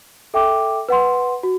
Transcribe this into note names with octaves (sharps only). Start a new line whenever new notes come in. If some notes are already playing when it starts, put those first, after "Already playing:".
A4 E5 G5 D6
B4 F#5 C6
F#4